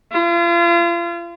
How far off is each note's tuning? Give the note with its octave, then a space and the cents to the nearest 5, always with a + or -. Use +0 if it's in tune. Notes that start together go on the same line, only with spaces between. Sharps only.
F4 -35